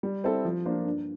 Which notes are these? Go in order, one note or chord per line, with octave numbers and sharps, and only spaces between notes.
G3
C4 E4 A4
F3
A#3 D4 F4 C5
G2